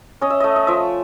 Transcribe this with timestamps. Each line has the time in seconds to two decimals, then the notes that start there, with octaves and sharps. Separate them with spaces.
0.21 C#4 D#5
0.30 E5
0.40 A3 D#5
0.56 D#5
0.67 F3 E5